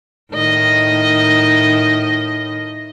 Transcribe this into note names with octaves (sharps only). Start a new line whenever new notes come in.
A2 D#3 D#5